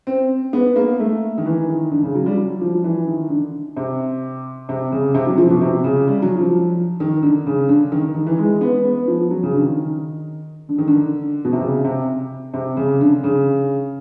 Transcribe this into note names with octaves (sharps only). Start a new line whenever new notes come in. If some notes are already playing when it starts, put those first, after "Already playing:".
C4
B3
A#3
A3
D#3
E3
D#3
D3
C#3
F#3
G3
F#3
F3
E3
D#3
D3
C3
C3
C#3
C3
F#3
F3
B2
C3
C#3
G3
F#3
F3
D#3
D3
C#3
D3
D#3
D#3
E3
G#3
B3
B3
F3
F#3
C#3
D3
D#3
D3
D#3
D3
B2
C3
C#3
C3
C3
C#3
D3
C#3